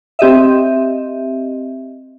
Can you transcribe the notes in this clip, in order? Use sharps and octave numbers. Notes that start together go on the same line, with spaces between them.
C4 G4 D#5 E5